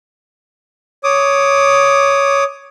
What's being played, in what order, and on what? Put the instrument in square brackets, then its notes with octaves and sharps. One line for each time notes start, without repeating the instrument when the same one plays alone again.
[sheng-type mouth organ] C#5 D6 D#6